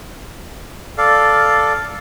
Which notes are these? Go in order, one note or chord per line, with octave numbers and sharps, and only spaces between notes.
A4 D5 F5